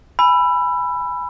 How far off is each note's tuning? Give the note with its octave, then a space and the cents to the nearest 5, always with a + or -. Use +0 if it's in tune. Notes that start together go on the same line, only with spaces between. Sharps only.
G#5 +0 B5 +0 E6 +25